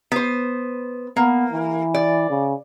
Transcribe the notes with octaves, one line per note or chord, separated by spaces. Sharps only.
B3 C5
A#3 B3
E3
D5
C#3